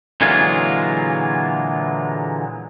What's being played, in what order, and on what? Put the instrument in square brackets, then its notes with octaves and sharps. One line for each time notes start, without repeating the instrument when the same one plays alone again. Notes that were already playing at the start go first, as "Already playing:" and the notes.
[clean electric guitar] A#2 D3 E3 F#3 G#3 F4